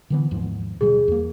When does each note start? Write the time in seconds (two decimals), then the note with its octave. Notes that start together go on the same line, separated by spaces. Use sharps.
0.10 D3 E3 B3
0.31 D#2 G#2 F3
0.81 D1 B2 G3 G#4
1.08 E2 A#3